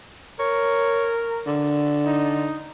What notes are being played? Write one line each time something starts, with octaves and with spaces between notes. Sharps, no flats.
A#4 C#5
D3
D#4